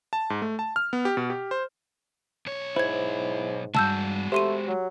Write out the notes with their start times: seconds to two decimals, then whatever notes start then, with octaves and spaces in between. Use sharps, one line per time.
0.13 A5
0.30 G#2
0.42 A3
0.59 A5
0.76 F6
0.93 B3
1.05 G4
1.17 B2
1.30 G4
1.51 C5
2.46 B1 C#5
2.76 G#2 E4 C5 G#6
3.75 C#2 G2 G#3 F#4 A5 E6 G6
4.32 A3 G4 C5 C6 D#7
4.68 F#3